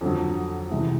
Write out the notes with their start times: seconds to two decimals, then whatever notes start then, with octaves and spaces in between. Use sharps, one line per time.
0.01 F2 D3 F#3
0.70 C2 C3 E3 G#3